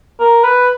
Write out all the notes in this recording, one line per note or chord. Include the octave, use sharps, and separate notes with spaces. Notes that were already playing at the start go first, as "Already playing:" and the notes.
A#4
B4